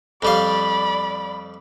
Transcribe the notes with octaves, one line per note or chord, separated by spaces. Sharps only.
F2 G3 D5 F5 B5